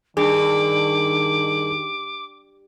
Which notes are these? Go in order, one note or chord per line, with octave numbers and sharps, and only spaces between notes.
G2 D#3 G#4 D6